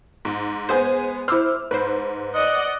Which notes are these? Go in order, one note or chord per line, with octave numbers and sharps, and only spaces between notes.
G#2
G#3 B3 C5 G#5
E4 C5 D6 E6 F6
G#2 B4 C5
D5 D#5 F#5